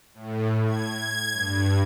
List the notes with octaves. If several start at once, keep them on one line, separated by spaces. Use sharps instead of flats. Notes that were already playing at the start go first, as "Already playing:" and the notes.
A2
G#6
G2